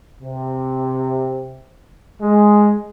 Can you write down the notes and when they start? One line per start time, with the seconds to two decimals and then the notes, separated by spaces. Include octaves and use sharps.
0.22 C3
2.21 G#3